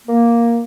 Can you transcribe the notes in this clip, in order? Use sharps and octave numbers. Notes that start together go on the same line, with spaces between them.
A#3